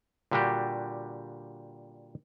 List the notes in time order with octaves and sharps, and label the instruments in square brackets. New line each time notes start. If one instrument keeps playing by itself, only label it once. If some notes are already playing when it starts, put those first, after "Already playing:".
[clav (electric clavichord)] A#2 D3 G3 D4 F#4 G4